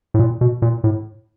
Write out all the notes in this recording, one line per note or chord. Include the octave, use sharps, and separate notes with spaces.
A2
A#2
B2
A#2
A2